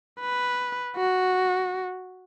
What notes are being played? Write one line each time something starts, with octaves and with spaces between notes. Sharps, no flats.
B4
F#4